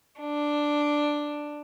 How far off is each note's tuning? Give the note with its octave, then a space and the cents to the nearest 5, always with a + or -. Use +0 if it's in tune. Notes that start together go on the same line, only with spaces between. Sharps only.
D4 +5